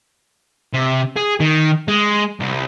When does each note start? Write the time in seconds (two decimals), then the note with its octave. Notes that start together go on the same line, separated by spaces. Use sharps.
0.73 C3
1.16 G#4
1.40 D#3
1.88 G#3
2.40 C2